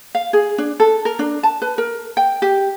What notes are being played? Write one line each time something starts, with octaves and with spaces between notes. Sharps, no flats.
F5
G#4
D4
A4
A#4
D4
A5
B4
A#4
G5
G4